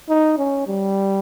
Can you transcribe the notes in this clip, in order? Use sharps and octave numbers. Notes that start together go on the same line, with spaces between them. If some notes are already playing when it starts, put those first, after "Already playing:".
D#4
C#4
G3